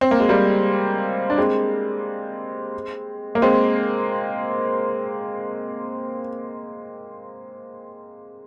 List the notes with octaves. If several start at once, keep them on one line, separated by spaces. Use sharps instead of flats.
C4
A#3
G#3
G3 A#3
D4
G#3 C4
A#3
G#3 C4